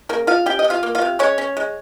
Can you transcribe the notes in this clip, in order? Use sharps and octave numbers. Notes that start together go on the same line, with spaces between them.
C#3 A#3 A#4
F3 F4 F5
C#4 G4 G5
D#5
C3
F4 F5
A#3
F4 F5
C3
G#3 C#4 C#5
C#4
G#3